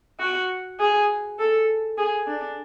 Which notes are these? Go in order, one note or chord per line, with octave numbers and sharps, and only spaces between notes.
F#4
G#4
A4
G#4
D4